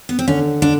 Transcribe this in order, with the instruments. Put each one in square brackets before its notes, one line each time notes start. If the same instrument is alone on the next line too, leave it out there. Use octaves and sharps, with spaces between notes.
[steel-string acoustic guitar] B3
C4
[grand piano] D3 [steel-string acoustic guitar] C#4
[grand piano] D3 [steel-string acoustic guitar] D4